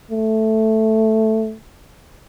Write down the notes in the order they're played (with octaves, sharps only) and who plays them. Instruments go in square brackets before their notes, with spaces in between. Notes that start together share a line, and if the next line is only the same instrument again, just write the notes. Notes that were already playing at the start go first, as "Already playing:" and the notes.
[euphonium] A3